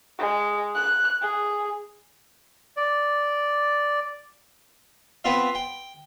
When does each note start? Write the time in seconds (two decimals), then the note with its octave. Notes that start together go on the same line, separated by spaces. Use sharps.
0.19 G#3
0.75 F#6
1.22 G#4
2.77 D5
5.24 B3 C4 F4 F5
5.55 G5